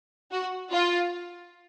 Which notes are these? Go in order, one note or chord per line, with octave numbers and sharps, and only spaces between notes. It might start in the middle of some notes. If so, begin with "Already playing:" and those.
F#4
F4